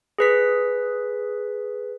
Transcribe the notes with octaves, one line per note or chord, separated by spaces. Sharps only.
G#4 B4 B6